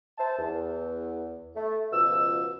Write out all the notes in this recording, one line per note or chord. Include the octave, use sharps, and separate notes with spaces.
C5 E5 A5
E2
A3
C#2 B2 F3 E6